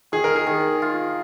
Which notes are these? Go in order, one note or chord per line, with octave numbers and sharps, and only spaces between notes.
D#3 G#4
A#4
G#4
D#3
F4